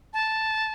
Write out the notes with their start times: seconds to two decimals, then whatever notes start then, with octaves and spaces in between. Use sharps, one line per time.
0.13 A5